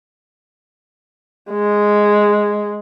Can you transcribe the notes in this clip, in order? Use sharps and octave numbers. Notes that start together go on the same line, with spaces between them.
G#3